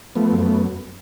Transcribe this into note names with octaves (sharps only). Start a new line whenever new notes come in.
F3 A3 B3
F#2
A3 B3